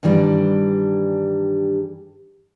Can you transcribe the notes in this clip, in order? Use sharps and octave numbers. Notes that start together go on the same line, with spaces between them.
G2 D#3 E3 G3 D4